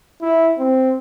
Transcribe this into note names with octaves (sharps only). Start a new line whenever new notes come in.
E4
C4